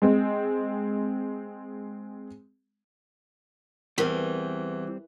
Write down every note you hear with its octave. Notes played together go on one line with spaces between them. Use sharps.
G#3 C4
E2 E3 G3 C4 A#4 B4